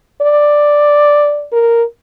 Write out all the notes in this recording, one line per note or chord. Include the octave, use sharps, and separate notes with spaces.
D5
A#4